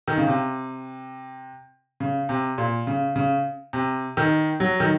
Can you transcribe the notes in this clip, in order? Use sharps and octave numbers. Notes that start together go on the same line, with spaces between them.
D#3
C#3
C3
C#3
C3
A#2
C#3
C#3
C3
D#3
F#3
D#3